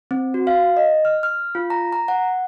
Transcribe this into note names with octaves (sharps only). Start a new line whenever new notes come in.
C4
F#4
F5
D#5
F6
F6
F4
A#5
A#5
F#5